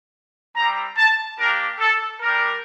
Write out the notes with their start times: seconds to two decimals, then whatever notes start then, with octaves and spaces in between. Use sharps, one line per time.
0.56 G3 C4 G4 A#5
0.97 A5
1.39 A#3 D4 G4 A#4
1.80 A4
2.22 G3 D4 G4 A#4